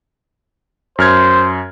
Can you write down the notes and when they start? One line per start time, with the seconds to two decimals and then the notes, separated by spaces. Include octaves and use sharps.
0.99 F#2 C5 F6 G#6